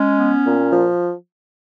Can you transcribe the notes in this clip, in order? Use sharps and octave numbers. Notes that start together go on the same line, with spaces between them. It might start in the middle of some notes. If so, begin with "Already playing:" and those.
Already playing: G#3 C#4
B3
A#2
F3